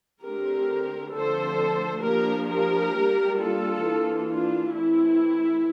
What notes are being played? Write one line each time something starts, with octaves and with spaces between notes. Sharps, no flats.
D3 A3 C4 G4 A#4
D3 F3 A3 C4 A4 C5
F3 A#3 D4 G4 A#4
G4 A#4
G3 A#3 D4
F4 A4
E3 A#3 D4
D4 F4
E3 A3 C4 E4